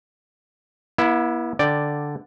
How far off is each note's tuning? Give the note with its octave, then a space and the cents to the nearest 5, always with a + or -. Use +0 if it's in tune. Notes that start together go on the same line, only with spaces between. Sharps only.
B3 -45 E4 +0
D3 +0 D5 +0 G5 +0